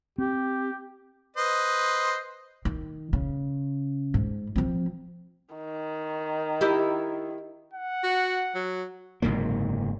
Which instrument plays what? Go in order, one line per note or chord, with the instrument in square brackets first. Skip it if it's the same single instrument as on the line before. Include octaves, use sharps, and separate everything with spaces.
[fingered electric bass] C4 [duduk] G4
[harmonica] B4 C5 D#5
[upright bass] D#3
C#3
G#2
F3 C4
[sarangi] D#3
[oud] E4 G4 D#5
[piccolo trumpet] F#5
[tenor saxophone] F#4
F#3
[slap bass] F#1 G#2 C3 A#3